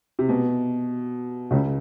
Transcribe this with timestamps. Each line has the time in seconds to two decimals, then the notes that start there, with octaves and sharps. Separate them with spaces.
0.19 C3
0.29 B2
1.51 C#2 C#3